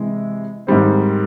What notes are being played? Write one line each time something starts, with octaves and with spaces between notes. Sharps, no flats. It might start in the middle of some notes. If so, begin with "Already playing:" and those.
Already playing: C3 E3 G#3
G#2 D#3 G3 C4